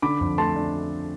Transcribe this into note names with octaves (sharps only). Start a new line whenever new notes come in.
D3 B5 D6
F2
A3 A5 C6
D4